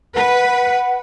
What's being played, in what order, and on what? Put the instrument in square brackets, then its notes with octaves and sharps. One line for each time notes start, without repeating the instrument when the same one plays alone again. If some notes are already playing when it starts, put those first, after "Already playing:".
[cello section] B4 [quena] F#5